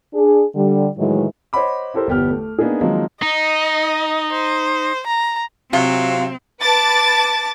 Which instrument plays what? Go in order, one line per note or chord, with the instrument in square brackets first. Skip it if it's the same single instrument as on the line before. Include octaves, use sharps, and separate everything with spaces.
[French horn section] D4 G#4
D3 G3
A2 D#3 E3 F#3 G#3
[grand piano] C5 C#5 D#5 F#5 B5 D6
E4 G4 A4 A#4 C5
G1 E2 B3 G4 G5 F6
A3
A#3 B3 D4 D#4 G#4
D#3 F3 F#3 G#3 A#3 C4
[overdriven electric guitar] D#4 [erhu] D#5
[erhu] C5
A#5
[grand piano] C3 [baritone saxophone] F#3 [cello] C4 [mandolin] F4
[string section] B4 A5 D6 A6